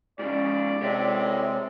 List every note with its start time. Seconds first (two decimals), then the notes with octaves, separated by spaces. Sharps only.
0.19 G#2 C#3 D5
0.83 C3 G#3 C4 C#5 E5